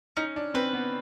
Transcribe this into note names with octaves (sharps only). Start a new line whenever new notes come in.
C#4 D#4
D4
C4 B4
B3